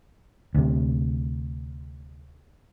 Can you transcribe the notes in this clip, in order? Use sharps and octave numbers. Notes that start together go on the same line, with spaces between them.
D2 C3